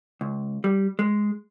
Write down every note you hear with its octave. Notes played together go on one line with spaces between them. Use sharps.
C#2
G3
G#3